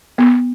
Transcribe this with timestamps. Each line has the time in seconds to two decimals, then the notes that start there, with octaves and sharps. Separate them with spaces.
0.18 B3